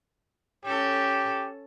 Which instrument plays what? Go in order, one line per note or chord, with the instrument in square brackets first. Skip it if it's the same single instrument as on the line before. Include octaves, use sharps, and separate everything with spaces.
[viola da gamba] C#4 A4 [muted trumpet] G4